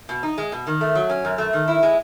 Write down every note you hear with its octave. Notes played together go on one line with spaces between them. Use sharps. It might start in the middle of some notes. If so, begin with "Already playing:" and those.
B2
D#4
G#3
B2
D#3
A3
F#3
C#4
F#2
A3
D#3
E4
G#3